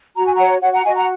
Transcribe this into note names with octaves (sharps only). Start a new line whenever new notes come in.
F#4 A#5
G#5
C#5 F#5 A#5
F#4 C#5 F#5
F#5 A#5
F#4 D#5 G#5
F#5 A#5